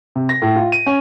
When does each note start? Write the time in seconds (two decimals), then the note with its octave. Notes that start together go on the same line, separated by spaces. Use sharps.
0.16 C3
0.29 A#6
0.42 A2
0.56 F4
0.72 D#7
0.86 C#4